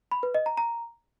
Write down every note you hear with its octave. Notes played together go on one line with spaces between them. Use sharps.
B5
B4
D#5
A#5
A#5